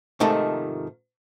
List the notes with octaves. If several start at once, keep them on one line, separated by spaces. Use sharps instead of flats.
G#2 C3 D#3 F3 A3